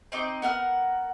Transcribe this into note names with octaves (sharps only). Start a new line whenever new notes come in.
C4 D#4 D#5 D6
B3 A#4 F#5 F6